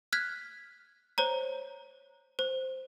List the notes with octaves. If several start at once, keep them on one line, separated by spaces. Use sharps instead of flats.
F6 F#6 G#6 B6
C5 C#5 A#5
C5